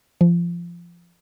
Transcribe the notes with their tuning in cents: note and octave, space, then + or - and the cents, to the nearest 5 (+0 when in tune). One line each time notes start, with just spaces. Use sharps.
F3 -20